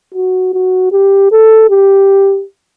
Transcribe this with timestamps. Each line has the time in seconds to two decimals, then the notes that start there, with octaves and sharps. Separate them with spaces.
0.14 F#4
0.54 F#4
0.92 G4
1.31 A4
1.70 G4